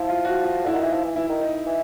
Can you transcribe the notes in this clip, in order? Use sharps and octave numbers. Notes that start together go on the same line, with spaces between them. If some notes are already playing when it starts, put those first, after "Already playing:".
Already playing: F3 E4
F4
F#4
F4
D3 E4
D#3
E3 D#4
F3 E4
E3
E3 E4
D#3
D#4
E3